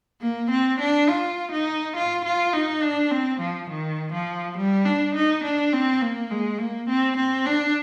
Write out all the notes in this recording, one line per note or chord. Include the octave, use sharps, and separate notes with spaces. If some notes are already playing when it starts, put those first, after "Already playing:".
A#3
C4
D4
F4
D#4
F4
F4
D#4
D4
C4
F3
D#3
F3
G3
D4
D#4
D4
C4
A#3
G#3
A#3
C4
C4
D4